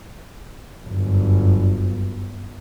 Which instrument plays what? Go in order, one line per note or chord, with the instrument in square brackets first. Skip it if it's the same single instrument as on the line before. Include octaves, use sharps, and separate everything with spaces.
[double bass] G1 F#2